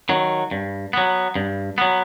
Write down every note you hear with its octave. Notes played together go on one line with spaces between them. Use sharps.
D#3 F#3
G2
F#3 B3
G2
F#3 B3